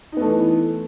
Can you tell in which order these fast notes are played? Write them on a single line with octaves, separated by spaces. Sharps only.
D#4 B3 A3 E3